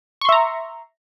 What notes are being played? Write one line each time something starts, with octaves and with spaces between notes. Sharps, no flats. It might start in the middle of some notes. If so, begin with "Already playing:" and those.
E5 A#5 C6 C#6